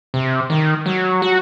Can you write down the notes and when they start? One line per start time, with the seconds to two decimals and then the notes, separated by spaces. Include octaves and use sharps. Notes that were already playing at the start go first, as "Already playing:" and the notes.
0.14 C3
0.50 D#3
0.86 F#3
1.22 F#4